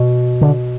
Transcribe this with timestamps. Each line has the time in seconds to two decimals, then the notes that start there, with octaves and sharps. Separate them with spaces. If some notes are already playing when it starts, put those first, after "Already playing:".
Already playing: B2
0.41 D3